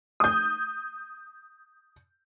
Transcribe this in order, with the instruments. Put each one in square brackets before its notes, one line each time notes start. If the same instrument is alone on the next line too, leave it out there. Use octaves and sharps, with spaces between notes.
[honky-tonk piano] D#6 G6